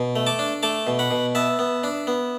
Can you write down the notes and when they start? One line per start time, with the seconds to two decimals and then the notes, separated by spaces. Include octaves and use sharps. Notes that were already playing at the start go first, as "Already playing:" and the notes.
Already playing: B2
0.16 A3
0.27 A5 D6
0.39 D4
0.63 A3 A5 D6
0.87 B2
0.99 F#5 B5
1.11 B2
1.35 B3 E5 A5
1.59 B3
1.84 D4
2.07 B3